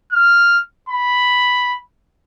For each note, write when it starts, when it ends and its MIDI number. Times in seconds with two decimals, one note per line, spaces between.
0.12 0.60 89
0.89 1.78 83